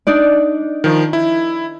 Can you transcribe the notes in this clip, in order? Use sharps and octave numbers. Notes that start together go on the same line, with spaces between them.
D4 D#4 D5
D#3 F3
E4